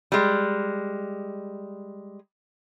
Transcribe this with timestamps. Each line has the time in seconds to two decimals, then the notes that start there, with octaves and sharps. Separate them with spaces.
0.12 G3 G#3